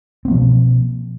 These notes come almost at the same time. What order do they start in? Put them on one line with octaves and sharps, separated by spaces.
C4 A#3 F3 B2